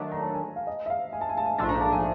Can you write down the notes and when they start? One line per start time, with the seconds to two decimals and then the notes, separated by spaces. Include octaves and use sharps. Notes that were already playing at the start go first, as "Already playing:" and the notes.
Already playing: D#3 F#3 A3 D4
0.12 A#5
0.22 A5
0.34 G#5
0.56 F5
0.67 D#5
0.86 E5
0.90 F5
1.13 G#5
1.21 A5
1.29 G#5
1.37 A5
1.46 G#5
1.58 A#1 G#2 F3 A3 D4 A5
1.69 A#5
1.81 A5
1.93 G#5